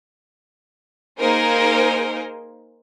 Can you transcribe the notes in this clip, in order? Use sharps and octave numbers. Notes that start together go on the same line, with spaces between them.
A#3 D#4 G#4 A#4 C5